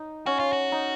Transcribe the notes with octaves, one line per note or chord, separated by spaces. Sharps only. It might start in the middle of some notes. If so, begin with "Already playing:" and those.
Already playing: D#4
C#4 F#4
F4
F#4
D#4